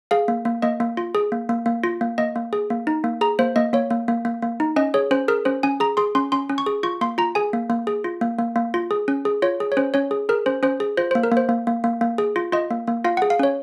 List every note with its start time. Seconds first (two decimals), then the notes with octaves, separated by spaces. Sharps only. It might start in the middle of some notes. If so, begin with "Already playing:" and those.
0.11 G#4 F5
0.28 A#3
0.45 A#3
0.62 A#3 D#5
0.80 A#3
0.97 F4
1.15 G#4
1.32 A#3
1.49 A#3
1.66 A#3
1.84 F4
2.01 A#3
2.18 A#3 D#5
2.36 A#3
2.53 G#4
2.70 A#3
2.87 D#4
3.04 A#3
3.21 G#4 A#5
3.39 A#3 C5
3.56 A#3 D#5
3.73 A#3 C#5
3.90 A#3
4.08 A#3
4.25 A#3
4.42 A#3
4.60 D#4
4.76 C#4 D#5
4.94 G#4 C#5
5.11 C#4 C5
5.28 G#4 A#4
5.45 C#4 C5
5.63 C#4 G#5
5.80 G#4 A#5
5.97 G#4 C6
6.15 C#4 C6
6.32 C#4 C6
6.49 C#4
6.58 C#6
6.66 G#4
6.83 F4 C#6
7.01 A#3 C6
7.18 F4 A#5
7.35 G#4 G#5
7.53 A#3
7.70 A#3
7.87 G#4
8.04 F4
8.21 A#3
8.39 A#3
8.56 A#3
8.74 F4
8.91 G#4
9.08 C#4
9.25 G#4
9.42 F4 C#5
9.60 G#4
9.72 C#5
9.77 C#4 C5
9.94 C#4 C#5
10.11 G#4
10.29 G#4 A#4
10.46 C#4 C5
10.63 C#4 C5
10.80 G#4
10.97 F4 C5
11.11 C5
11.15 A#3
11.23 A#4
11.32 A#3
11.37 C5
11.49 A#3
11.67 A#3
11.84 A#3
12.01 A#3
12.18 G#4
12.36 F4
12.52 F4 D#5
12.71 A#3
12.87 A#3
13.04 F4 F5
13.17 F#5
13.22 G#4
13.30 F5
13.39 C#4 C#5